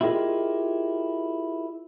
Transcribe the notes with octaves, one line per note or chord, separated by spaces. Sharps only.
E4 F4 G4 G#4 A#4 D#5